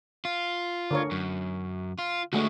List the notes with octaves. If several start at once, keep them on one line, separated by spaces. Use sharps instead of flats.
F4
D3 A#4 C#5
F#2
F4
D3 G#3 A3 F#4